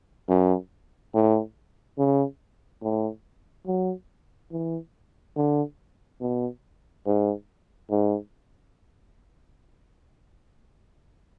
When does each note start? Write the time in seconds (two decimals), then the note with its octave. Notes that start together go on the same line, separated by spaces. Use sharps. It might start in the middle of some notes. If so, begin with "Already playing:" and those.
0.29 F#2
1.14 A2
1.98 C#3
2.83 A2
3.67 F#3
4.51 E3
5.37 D3
6.21 B2
7.06 G#2
7.90 G#2